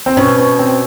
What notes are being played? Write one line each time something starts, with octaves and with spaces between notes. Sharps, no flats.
C4
B2 C#4
C4